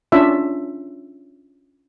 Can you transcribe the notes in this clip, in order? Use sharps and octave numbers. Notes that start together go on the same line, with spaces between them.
C#4 D4 F4 E5